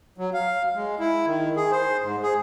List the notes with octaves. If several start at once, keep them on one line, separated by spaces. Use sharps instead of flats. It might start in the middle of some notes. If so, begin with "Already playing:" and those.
F#3
F5
G#3
E4
D#3
G#4
C5
G#2
G#4